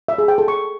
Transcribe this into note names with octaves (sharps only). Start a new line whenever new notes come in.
E5
G#4
G5
A4
C#6